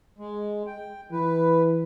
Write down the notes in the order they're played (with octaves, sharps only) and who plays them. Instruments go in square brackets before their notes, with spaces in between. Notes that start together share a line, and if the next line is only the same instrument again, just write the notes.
[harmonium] G#3
G5
[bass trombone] E3 [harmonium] B4